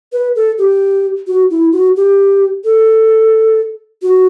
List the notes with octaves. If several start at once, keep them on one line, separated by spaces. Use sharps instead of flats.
B4
A4
G4
F#4
E4
F#4
G4
A4
F#4